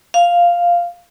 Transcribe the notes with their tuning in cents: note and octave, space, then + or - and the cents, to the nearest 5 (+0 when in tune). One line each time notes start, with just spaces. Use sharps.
F5 +0